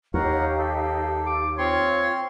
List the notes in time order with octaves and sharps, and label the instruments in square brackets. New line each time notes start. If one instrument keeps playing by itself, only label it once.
[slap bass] D#2 [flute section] D#4 G4 F5 [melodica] A#4 C#5 F#5
[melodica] A4
[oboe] D6
[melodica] C4 C6 [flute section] F4 [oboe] C#5